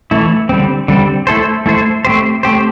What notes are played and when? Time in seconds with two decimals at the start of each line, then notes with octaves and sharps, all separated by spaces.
0.11 E3 A3 E4
0.49 D3 G3 C4
0.88 D3 G3 C4
1.27 A3 E4 A4 C5
1.66 A3 E4 A4 C5
2.05 A3 C4 G4 C5
2.43 A3 C4 G4 C5